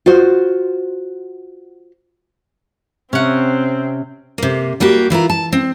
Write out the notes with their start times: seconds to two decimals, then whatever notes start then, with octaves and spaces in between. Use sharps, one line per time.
0.06 F4 F#4 C5
3.13 C3 C4 C#4 F#5
4.38 C3 A#3
4.80 G3 A#3 F#4 G4
5.10 E3 E4 F4 A#4
5.30 A5
5.53 C4